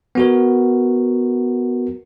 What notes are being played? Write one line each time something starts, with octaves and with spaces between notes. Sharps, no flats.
B3 F#4 A#4